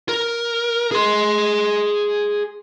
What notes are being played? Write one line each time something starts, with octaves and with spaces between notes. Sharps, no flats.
A#4
G#4 C6